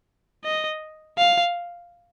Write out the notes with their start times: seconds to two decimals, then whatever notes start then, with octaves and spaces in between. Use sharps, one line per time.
0.45 D#5
1.18 F5